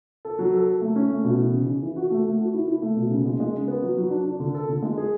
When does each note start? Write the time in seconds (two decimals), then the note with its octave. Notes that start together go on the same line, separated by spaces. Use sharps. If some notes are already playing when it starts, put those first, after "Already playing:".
0.25 A4
0.39 F#3
0.54 A4
0.67 A4
0.81 A3
0.96 C#4
1.10 A3
1.24 B2
1.39 E3
1.53 C#3
1.67 C#3
1.82 E3
1.96 F#4
2.11 A3
2.25 A3
2.39 F#4
2.54 E4
2.67 E4
2.82 A3
2.96 B2
3.11 C#3
3.26 G#3
3.40 G#3
3.54 C#3
3.68 B3
3.82 F#3
3.97 F#3
4.11 D4
4.25 D4
4.40 D3
4.54 A4
4.69 D3
4.83 G#3
4.97 G#4